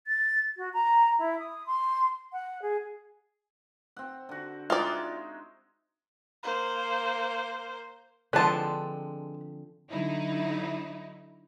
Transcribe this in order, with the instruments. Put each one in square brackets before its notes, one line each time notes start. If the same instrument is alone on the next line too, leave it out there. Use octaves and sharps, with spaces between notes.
[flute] A6
F#4
A#5
E4
D#6
C6
F#5
G#4
[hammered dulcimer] C4 F#5
D3 F#4
[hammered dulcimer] G#3 D#4 E5 [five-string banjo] F4 D5
[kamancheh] A#3 C5
[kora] D3 F3 C4 [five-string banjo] G#3 A5 [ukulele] D4 B4
[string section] D3 F#3 D#4 E4